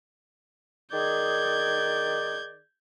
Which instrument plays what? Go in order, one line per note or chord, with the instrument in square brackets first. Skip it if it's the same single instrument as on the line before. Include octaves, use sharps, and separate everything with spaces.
[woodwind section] D#3 G#4 D5 [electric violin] G6 G#6